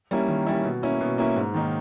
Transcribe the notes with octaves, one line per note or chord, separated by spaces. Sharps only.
G3 A#3 C#4 E4
D#3
G3 A#3 C#4 E4
B2
A#3 C#4 E4
B2
A#3 C#4 E4
G#2
D#3 A#3 D#4